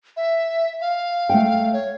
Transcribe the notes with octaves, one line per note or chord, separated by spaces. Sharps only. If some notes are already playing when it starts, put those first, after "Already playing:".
E5
F5
A3 F#5 G5
C#5